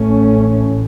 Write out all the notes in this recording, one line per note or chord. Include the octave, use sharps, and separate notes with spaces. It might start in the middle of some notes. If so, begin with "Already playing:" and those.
Already playing: A1 A2 A3 C#4